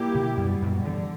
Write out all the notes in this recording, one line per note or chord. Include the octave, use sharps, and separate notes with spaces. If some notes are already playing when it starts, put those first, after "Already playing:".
Already playing: A#2 G3 A#3 E4 G4
B2 D3
F#2 B2 G3 B3
F#2 A#2
D3 E3 G3